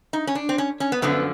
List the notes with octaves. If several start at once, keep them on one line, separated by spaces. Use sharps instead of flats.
D#4
C#4
D4
C4
C#4
C#4
B3
F#2 D3 F3 B3